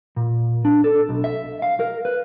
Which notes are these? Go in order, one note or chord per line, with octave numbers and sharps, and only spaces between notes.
A#2
D4
A4
B1
E5
F5
A#4
B4